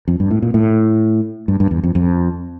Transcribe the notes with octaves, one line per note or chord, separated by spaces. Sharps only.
F2
G2
A2
A#2
A2
G2
G2
E2
F2
F2